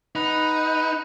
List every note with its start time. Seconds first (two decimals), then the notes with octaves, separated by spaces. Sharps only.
0.15 D#4 B4 F#5 B5